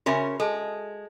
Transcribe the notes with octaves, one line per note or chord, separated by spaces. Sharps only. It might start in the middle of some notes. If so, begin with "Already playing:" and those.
C#3 C#4 F#4 A#4 E5 B5
G#3 A4 A5